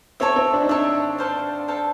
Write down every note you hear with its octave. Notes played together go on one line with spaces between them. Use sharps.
C4 A4 C#5 E5
C4
D4
D#4
D4 A4 C#5 E5
A4 C5 F5
A4 C5 F5